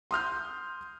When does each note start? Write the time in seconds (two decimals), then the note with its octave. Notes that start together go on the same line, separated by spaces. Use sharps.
0.11 C6 D#6 F6 G6